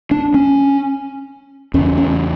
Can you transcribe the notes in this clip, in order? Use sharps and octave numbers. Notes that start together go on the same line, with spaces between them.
D4
C#4
E2 C#3 C#4
C#4